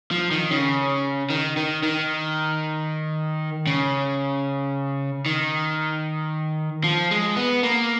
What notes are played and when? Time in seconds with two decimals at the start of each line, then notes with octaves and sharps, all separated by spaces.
0.11 F3
0.31 D#3
0.51 C#3
1.30 D#3
1.57 D#3
1.83 D#3
3.67 C#3
5.26 D#3
6.84 F3
7.11 G#3
7.36 B3
7.63 A#3